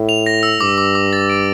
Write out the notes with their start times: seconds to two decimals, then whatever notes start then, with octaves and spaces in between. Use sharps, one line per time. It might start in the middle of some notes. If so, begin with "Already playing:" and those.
Already playing: A2
0.09 F7
0.26 A#6
0.43 E6
0.60 G2 D6
0.78 D6
0.95 D6
1.13 A6
1.30 D7